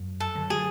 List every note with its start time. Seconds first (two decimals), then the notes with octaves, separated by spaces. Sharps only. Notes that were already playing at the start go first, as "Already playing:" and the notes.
Already playing: F#2
0.20 A4
0.35 D3 F#3
0.50 G#4